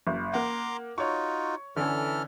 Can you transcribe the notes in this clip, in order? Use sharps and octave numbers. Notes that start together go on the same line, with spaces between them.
F#1
A#3 F#5 A#5 C6 D6
D#4 F4 F#4 C#5 C#6
D3 E3 C#4 A4 F6